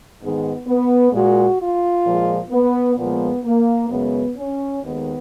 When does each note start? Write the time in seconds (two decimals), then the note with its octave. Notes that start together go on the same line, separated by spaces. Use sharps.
0.19 G#2 D#3 G#3 B3
0.67 B3
1.12 A#2 G#3 F#4
1.59 F4
2.05 A#2 F3 G#3
2.50 B3
2.96 A#2 F3 G#3 B3
3.44 A#3
3.89 F#2 C#3 G#3 B3
4.36 C#4
4.81 D#2 D#3 G#3 B3